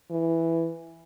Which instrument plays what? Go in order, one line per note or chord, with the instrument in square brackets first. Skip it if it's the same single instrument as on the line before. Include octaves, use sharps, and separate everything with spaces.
[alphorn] E3